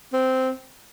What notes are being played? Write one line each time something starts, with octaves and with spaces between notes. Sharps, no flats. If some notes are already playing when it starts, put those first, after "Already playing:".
C4